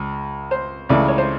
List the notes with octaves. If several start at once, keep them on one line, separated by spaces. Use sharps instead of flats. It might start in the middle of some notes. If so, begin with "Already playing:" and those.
Already playing: C#2
C5
C#2 C#3 E3 A3 D5
C#5
C5